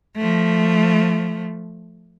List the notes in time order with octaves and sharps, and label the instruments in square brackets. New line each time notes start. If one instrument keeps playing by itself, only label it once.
[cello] F3 A3